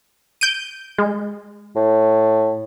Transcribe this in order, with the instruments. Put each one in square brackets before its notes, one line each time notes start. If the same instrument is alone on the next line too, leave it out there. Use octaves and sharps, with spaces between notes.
[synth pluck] G6 D7 D#7
G#3
[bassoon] A2